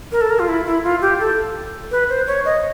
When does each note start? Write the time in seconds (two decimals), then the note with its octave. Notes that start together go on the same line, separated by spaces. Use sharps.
0.12 A#4
0.21 A4
0.30 A#4
0.39 F4
0.48 E4
0.66 E4
0.84 F4
1.01 G4
1.20 A4
1.91 B4
2.10 C5
2.27 C#5
2.45 D#5